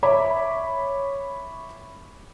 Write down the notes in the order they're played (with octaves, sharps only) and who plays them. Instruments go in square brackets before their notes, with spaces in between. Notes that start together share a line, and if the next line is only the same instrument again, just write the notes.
[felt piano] C#5 E5 B5 D6